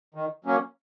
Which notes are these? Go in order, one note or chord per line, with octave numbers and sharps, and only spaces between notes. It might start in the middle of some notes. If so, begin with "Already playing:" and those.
D#3
F#3 A#3 C#4